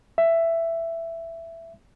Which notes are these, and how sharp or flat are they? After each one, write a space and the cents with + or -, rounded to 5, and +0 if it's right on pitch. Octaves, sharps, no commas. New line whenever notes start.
E5 +10